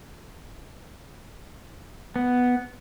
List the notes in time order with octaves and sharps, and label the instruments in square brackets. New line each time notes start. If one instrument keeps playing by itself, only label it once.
[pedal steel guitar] B3